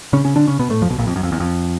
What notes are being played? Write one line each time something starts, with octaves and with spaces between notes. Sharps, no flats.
C#3 C#4
C#3 C#4
D3 D4
C#3 C#4
B2 B3
A2 A3
F2 F3
B1 B2
A#1 A#2
F2
F#2
F2
E2
F2